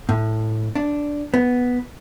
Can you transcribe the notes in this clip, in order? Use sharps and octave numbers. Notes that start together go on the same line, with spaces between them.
A2
D4
B3